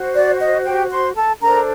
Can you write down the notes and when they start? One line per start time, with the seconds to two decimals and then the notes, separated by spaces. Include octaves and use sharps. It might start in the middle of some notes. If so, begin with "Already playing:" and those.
Already playing: F#4 C5
0.15 D5
0.39 D#5
0.64 G4 G5
0.90 C5 C6
1.15 A4 A5
1.41 D4 A4 A#4 C5 A#5